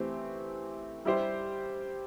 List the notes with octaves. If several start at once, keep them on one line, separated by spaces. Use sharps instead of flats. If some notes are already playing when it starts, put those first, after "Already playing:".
Already playing: E3 A3 C4 G4 C5
G3 E4 G4 C5